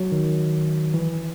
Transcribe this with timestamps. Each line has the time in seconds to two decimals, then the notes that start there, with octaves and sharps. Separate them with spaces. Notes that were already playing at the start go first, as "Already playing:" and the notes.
Already playing: F#3
0.12 D#3
0.94 E3